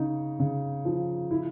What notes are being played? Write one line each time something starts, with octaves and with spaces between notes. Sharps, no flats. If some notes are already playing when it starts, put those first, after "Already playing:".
Already playing: C#3 D#4
C#3
F3
E4